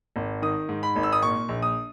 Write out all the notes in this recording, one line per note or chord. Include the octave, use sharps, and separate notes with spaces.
G#1
D#3 D#6
G#2
B5
G#1
E6
D#6
A#2 C#6
A#1
D#6